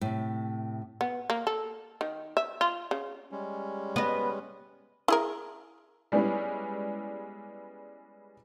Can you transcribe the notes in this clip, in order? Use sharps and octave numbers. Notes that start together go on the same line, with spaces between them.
A2 C3
B3
A#3
A4
D#3
E5
F4
C#3
G3 G#3 C#4
B3 D#5
E4 G#4 A#4
G3 G#3 B3 C#4 E4